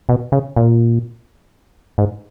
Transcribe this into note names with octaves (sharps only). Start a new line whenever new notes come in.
B2
C#3
A#2
G#2